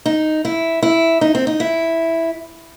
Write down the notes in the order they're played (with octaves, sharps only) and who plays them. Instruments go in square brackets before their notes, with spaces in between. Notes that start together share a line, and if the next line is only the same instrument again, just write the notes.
[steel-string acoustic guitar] D#4
E4
E4
D#4
C4
D#4
E4